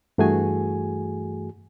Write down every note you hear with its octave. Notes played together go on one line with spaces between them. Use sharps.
G2 E3 A3 F#4 G#4 G#5